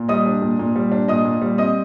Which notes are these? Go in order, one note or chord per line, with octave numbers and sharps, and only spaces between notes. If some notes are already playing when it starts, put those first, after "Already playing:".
Already playing: A#2
G3 D#5 D#6
D4
A#2
A#2
G3
D4
A#2 D#5 D#6
A#2
G3
C4 D#5 D#6